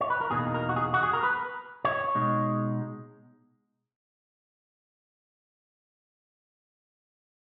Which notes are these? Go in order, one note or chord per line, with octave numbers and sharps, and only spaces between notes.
C#5
B4
A#4
E2 B2 A#3 D#4 G#4
A#4
F#4
G#4
F#4
G#4
A#4
B4
C#5
B2 G#3 D#4